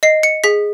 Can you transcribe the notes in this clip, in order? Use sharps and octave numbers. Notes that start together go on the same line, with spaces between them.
D#5 C7
C#7
G#4 B6